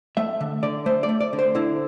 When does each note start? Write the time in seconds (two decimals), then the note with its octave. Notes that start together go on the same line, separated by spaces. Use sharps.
0.17 A3 E5
0.41 D3
0.63 D3 D5
0.86 A3 C5
1.03 D5
1.09 A3
1.20 D5
1.33 D3
1.39 C5
1.55 D3 E4